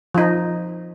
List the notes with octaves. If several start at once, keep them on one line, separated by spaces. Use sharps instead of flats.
F3 D#4